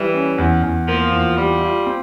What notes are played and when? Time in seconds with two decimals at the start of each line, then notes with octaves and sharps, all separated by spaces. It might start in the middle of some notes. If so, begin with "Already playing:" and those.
Already playing: E3 G3
0.14 C#4
0.38 E2
0.63 E2
0.88 F3 A#3
1.12 E2
1.37 G3 F4
1.61 F4
1.86 C4